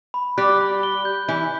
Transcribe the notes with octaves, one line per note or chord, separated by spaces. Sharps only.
B5
G3 G4 F#6
B5
G7
G6
E3 E4 G6